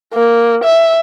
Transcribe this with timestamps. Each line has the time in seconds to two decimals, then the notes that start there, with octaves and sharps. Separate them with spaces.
0.14 A#3
0.64 E5